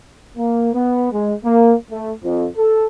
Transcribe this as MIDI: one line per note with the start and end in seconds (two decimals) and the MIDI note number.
0.38 0.70 58
0.74 1.09 59
1.12 1.33 56
1.44 1.73 58
1.91 2.11 57
2.24 2.46 41
2.57 2.86 69